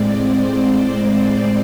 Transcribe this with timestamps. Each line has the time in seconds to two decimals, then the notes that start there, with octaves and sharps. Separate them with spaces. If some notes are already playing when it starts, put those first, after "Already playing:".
Already playing: A2 G#3 C4 D5
0.08 C5